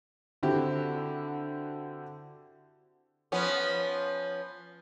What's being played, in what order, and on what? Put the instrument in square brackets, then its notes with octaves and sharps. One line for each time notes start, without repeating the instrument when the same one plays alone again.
[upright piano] D3 C4 E4 F#4 G4
[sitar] F3 B3 C#4